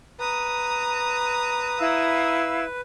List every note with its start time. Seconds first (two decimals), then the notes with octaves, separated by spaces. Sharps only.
0.20 B4 A#5 D#6
1.80 E4 F5 E6